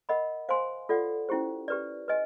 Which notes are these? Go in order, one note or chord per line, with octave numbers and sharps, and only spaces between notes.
A#4 D#5 F#5 B5
C5 F5 G#5 C6
F4 A4 D5 F#5
C#4 E4 G4 C5
G4 B4 D5
B4 D#5 G#5